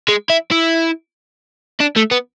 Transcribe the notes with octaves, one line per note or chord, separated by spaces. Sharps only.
G#3
E4
E4
D4
A3
B3